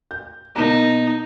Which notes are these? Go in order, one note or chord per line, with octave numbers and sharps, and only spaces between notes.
G6
B2 A#3 D#4 A#5